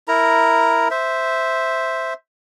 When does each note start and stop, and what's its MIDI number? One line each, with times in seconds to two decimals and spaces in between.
0.08 0.88 64
0.08 0.88 70
0.08 0.88 82
0.91 2.14 72
0.91 2.14 76